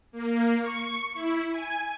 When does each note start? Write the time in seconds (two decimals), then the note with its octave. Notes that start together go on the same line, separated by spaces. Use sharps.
0.12 A#3
0.62 C#6
1.13 E4
1.50 G#5